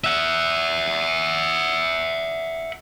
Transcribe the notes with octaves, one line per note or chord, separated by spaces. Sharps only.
E5 F#5